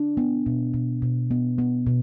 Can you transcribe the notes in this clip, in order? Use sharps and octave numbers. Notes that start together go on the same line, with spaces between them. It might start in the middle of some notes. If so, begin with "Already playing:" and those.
Already playing: D4
B3
B2
B2
B2
B3
B3
B2